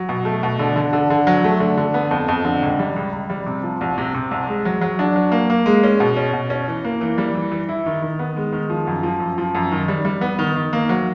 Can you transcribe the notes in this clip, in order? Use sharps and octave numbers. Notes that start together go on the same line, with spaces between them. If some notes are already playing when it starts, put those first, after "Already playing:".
Already playing: F#3
B2
A3
B2
D3
D3
D3
D3
F#3
A3
D3
D3
B3
F2
F2
D3
C#2
G3
C#2
C#2
G3
C3
F3
C2
C3
C3
C2
G#3
F#3
F#3
D4
F#3
A#3
A#3
G#3
C#4
B2
C#4
B2
C#4
E3
A#3
E3
G3
E3
E3
E4
D#3
D#3
B3
G#3
D#3
F3
F#2
F3
F#2
F3
F#2
D#3
G3
G3
B3
D#3
D#3
A#3
F#3